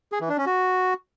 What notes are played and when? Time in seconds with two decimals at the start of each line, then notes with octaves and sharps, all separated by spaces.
0.12 G#4
0.21 E3
0.29 D4
0.38 C#4
0.46 F#4